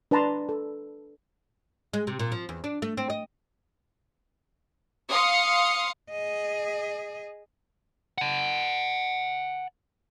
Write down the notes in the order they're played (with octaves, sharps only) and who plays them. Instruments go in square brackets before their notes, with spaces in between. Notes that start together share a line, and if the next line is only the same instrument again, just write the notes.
[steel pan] D4 B4 D5 A5 A#5 C6
A4
[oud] G#3
C3
A#2
F3
E2
D4
A3
C4
D#5
[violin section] F5 C6 D#6 C#7
[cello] G#4 D#5
[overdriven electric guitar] F#5 A5